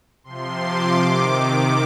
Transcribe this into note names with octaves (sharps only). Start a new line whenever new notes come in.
C3 F3 C6
D6
C3 D#3
D6